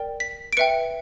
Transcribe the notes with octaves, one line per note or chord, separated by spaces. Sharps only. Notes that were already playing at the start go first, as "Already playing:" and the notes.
Already playing: A#4 D5 G5
B6
D7
B4 E5 G5 C#7